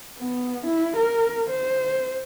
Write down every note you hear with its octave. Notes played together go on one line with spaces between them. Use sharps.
B3
E4
A#4
C5